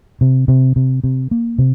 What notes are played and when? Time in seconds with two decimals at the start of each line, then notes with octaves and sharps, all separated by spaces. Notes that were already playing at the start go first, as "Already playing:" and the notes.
0.21 C3
0.48 C3
0.76 C3
1.04 C3
1.31 A#3
1.58 C3